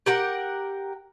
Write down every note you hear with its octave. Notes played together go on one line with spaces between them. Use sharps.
G4 A#4 F#5